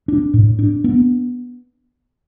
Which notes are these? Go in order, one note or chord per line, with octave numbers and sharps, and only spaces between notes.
D4
A2
D4
B3